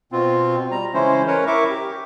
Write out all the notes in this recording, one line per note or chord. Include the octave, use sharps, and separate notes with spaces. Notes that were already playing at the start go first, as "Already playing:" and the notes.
B2 C4 F4
G3 A#5
C#3 E3 G#3 C#4 E4 C5
C#4 A#4 B4 C#5
E4 A#4 E5 C#6 D6
G4